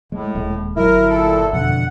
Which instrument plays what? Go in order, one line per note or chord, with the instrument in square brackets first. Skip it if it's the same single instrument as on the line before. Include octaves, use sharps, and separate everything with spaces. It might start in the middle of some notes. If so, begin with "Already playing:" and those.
[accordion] A2 [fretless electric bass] G#3
[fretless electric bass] D#1 G#3
[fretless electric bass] G1 F#3 [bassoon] E4 [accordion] A#4
[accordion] A#2 A4
[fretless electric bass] F2 B2 D3 [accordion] F#5